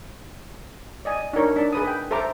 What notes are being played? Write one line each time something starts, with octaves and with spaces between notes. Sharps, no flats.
D5 D#5 G#5
D4 D#4 A#4 C#5
D4 A5
G#4 B4 D#6
G5
A4 C5 E5 A#5 D6